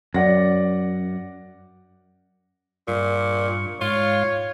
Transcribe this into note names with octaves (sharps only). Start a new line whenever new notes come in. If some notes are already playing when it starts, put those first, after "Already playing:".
F#2 D5 F#5 A#6
G2 A#2 C#6
G#2 F4 C#5 F5